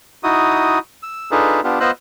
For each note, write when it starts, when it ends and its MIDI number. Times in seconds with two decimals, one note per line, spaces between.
0.24 0.79 63
0.24 0.79 64
0.24 0.79 66
0.24 0.79 87
1.03 1.31 88
1.31 1.61 62
1.31 1.61 63
1.31 1.61 65
1.31 1.61 68
1.31 1.61 69
1.31 1.61 71
1.64 1.79 59
1.64 1.79 62
1.64 1.79 65
1.64 1.79 67
1.80 1.91 59
1.80 1.91 65
1.80 1.91 72
1.80 1.91 75
1.80 1.91 88
1.80 1.91 90